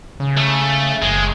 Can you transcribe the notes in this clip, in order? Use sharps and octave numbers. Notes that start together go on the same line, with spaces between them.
C#3
A3
F#1 G#3